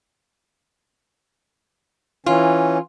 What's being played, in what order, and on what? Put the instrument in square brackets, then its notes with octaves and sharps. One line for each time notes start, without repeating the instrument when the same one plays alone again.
[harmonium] E3 C#4 [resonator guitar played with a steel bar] F4